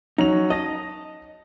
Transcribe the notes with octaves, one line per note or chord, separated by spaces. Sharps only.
F#3 C#4 D#4 F7
D#5 A5 A#6